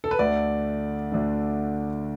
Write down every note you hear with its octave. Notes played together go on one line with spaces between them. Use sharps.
A4
B4
D2 D3 A3 D5
D2 D3 A3